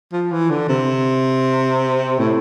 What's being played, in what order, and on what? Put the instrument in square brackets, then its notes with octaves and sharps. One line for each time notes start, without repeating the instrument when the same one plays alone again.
[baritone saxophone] F3
E3
D3
C3
A2